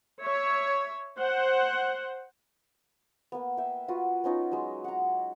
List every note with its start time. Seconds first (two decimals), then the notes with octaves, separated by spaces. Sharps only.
0.20 C#5 E5
1.19 C5 F#5
3.32 A#3 B3
3.57 E5 G5
3.88 F4 F#4 B4
4.24 B3 C#4 D#4 F4
4.52 F#3 G#3
4.84 F#5 A#5